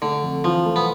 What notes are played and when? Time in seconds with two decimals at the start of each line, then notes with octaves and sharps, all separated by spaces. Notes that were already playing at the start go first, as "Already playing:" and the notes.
0.02 D3 A3
0.22 F2
0.44 E3 F3
0.65 A3
0.76 B3